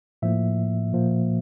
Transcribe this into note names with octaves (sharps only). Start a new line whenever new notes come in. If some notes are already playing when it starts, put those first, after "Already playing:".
A2 F3 A#3 E5
A#2 F3 A#3